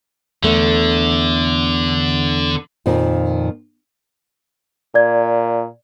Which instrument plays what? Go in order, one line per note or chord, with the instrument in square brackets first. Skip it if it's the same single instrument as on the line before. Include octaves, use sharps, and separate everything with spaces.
[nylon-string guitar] E2 A3 [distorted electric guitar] D3
[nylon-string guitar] F2 A#2 D#3 F3
[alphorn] A#2 [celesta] D5 G#6